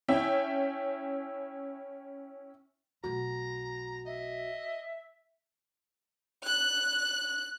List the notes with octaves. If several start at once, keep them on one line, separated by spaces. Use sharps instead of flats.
C#4 E4 E5 G5
B1 A3 F#4 A#5
D#5 E5
F#6